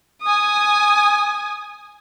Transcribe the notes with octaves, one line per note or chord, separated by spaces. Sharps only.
G#5 D#6